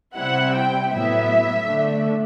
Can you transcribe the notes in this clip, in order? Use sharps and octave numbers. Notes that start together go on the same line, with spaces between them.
C3 G3 C4 E4 F#5
G5
A2 F#3 B3 E4 E5
D3 A3 D4